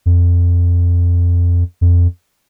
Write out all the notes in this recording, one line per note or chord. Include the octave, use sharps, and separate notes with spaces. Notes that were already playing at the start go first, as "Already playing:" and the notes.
F2
F2